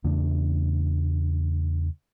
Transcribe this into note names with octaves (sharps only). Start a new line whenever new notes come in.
E2 C#3 A3 D4